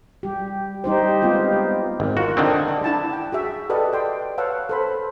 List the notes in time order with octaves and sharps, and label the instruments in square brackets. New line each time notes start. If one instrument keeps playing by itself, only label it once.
[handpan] G3 G4
G3 D#4 G4 C5
G#3 B3 C4 F4 G4
[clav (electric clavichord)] G#1
[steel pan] F4 A#4 [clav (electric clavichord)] F#4
[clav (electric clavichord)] D3 D#3 C4
[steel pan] D4
D4 E4 A5
F#5 G5
F#4 G#4 E5
G4 A4 B4 D5 D#5 F#5
D5 G5 C6
B4 C#5 F5 F#5 A5 E6
A4 C5 B5